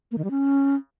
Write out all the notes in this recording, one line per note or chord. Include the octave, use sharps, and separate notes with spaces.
A#3
D#3
G3
C#4